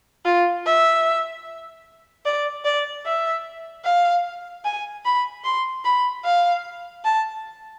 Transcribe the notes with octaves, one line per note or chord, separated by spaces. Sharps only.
F4
E5
D5
D5
E5
F5
G#5
B5
C6
B5
F5
A5